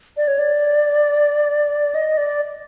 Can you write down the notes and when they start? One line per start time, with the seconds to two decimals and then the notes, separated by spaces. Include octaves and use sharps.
0.17 D5
0.28 C#5
0.39 D5
1.95 D#5
2.17 D5